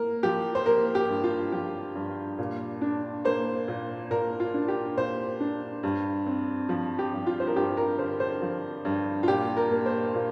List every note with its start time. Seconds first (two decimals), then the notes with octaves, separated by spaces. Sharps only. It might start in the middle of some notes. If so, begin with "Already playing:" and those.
Already playing: A#3 A#4
0.23 F3 G4
0.55 C5
0.66 A#3 A#4
0.95 G4
1.09 G2
1.24 F4
1.52 F3 G4
1.95 G2
2.39 A#2
2.81 D4
3.25 A#3 C5
3.68 A#2
4.11 A#2 A#4
4.40 F4
4.54 D4
4.68 G4
4.97 A#2 C5
5.40 D4
5.83 G2
6.26 C4
6.69 F3
6.99 G4
7.13 G2
7.27 F4
7.40 C5
7.47 A#4
7.56 G2 G4
7.77 A#4
7.99 D3 C5
8.20 C5
8.42 F3
8.85 G2
9.23 F4
9.28 A#2 G4
9.57 A#4
9.71 A#3
9.86 C5
10.14 A#2